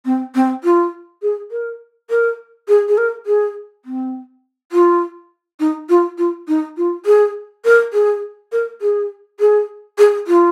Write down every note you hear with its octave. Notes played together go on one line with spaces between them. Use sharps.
C4
C4
F4
G#4
A#4
A#4
G#4
G#4
A#4
G#4
C4
F4
D#4
F4
F4
D#4
F4
G#4
A#4
G#4
A#4
G#4
G#4
G#4
F4